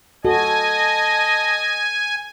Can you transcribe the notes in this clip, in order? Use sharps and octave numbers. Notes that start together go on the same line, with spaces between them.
F#4 A4 D#5 G#5 A5